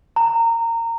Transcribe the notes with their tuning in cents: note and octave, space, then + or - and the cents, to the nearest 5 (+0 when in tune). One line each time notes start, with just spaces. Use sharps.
A#5 -20